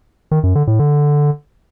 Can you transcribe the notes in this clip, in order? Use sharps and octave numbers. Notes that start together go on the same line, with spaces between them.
D#3
F#2
D3
A2
D3